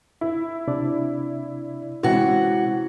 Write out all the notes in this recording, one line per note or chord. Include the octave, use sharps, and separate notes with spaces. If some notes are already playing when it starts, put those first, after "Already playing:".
E4
C3 D4 D5
C3 E3 G#3 C#4 F#4